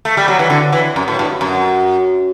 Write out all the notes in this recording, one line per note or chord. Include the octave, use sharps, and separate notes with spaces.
A3
G3
F#3
E3
D3
E3
F#2
A2
G2
F#2